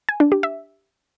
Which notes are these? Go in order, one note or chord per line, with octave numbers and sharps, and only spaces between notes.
G#5
D4
G4
E5